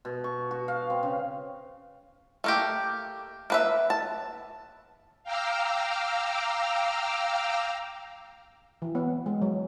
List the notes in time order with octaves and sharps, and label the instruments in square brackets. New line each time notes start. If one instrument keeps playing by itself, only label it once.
[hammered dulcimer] B2
C#6
F#4
F5
C4
C#3
[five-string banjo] A3 A#3 G4
A#3 B4 E5
A5
[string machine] F5 G5 A#5 D6 E6 F6
[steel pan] E3
B3
G#3
F#3